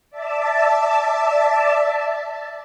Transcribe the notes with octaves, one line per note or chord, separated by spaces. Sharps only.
D5 E5 A5